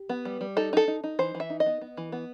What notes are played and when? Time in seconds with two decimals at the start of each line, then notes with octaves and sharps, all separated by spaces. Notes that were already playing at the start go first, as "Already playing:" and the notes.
Already playing: G4
0.09 B3
0.25 G3
0.41 G3
0.57 D#4 A4
0.73 D#4 A4
0.88 D#4
1.04 D#4
1.19 E3 C5
1.35 E3
1.40 E5
1.50 D#4
1.60 D#5
1.66 B3
1.81 B3
1.97 E3
2.12 B3